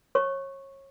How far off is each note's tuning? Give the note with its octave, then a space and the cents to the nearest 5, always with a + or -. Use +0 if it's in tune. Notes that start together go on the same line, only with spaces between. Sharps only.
C#5 -30 C#6 -10